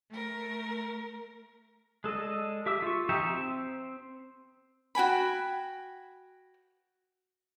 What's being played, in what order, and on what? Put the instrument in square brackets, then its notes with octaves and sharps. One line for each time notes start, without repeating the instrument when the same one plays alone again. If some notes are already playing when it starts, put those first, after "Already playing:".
[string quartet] A3 A#4
[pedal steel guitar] G#3 A4 D5 D#5
G4 E5 D6 E6
F4 C#6
F3 D#4 G4 E5 G5
C4
[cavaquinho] F#4 G5 G#5 B5